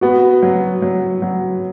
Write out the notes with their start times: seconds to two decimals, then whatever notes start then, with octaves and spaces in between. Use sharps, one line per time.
0.01 B3 F#4
0.43 F#3
0.82 F#3
1.22 F#3